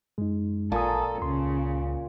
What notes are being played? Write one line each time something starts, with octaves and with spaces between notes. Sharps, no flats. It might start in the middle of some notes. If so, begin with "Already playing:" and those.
F#2 G#3 D#4
A1 A#2 A4 G#5 A5 D#6
C#2 C#3 C6